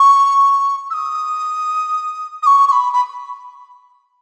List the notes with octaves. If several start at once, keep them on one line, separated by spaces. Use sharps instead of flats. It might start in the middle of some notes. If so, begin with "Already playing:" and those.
Already playing: C#6
E6
D#6
D#6
C#6
C#6
B5
B5